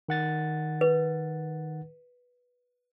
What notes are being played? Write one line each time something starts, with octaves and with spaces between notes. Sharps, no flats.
D#3 F#5 A6
B4